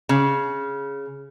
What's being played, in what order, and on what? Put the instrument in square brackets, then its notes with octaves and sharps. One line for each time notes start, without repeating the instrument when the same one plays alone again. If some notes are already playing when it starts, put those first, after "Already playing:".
[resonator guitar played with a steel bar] C#3